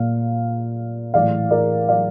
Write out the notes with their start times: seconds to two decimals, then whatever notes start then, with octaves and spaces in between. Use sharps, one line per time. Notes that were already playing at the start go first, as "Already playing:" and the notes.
Already playing: A#2 F5
1.14 A2 E3 D5 F5
1.51 A#4 D5
1.89 D5 F5